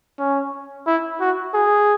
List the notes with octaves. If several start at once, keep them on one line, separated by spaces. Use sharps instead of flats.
C#4
E4
F#4
G#4